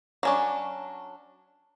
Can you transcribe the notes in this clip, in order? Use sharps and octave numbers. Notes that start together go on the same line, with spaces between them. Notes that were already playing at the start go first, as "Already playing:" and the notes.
F#3 C#4 D4